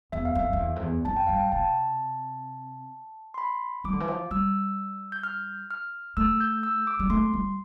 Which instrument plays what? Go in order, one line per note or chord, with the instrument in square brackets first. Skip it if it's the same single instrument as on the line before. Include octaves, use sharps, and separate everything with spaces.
[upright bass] E2 [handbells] E5
[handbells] F5
[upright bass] F2 [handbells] E5
[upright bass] F2
E2
F2
E2
[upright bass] F2 [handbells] A5
[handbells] G5
[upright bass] G2 [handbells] F5
[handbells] G5
[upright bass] C3 [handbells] A5
[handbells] C6
B5
[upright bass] G3 [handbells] D6
[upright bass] D3
E3
F3
[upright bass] G3 [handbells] E6
[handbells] G6
F6
F6
[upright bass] A3 [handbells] E6
[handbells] G6
E6
D6
[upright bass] G3
[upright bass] A3 [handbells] C6
[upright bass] G3